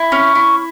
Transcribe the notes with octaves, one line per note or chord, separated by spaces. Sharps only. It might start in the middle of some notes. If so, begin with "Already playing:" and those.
Already playing: E4
C#4
E4